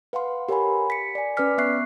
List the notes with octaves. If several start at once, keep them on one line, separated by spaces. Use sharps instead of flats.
B4 F5 F#5 C6
G4 A#4 C#5 F#5 G#5 B5
B6 C#7
D5 G#5
C#4 B4 D5 D6 F6 B6
B3 E5 C#6 F#6 C7